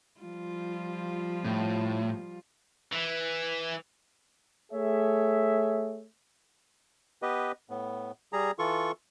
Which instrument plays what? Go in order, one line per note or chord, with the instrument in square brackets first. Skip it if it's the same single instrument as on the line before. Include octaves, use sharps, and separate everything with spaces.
[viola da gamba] F3 G3 F4
[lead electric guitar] A2
[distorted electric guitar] E3
[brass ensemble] A3 G#4 C#5 E5
[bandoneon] B3 G4 B4 D#5
A2 B3
G3 G#4 A#5
E3 F4 A4 C#6